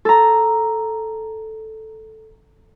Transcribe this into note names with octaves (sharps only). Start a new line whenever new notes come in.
A4 A#5